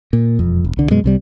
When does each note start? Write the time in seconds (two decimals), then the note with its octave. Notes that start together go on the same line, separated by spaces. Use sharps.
0.13 A#2
0.39 E1 F2
0.64 E1
0.77 C2 D3
0.91 F#2 B2 G#3
1.04 C2 C3 G3